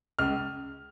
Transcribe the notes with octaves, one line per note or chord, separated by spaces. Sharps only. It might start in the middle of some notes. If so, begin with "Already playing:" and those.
C#2 F6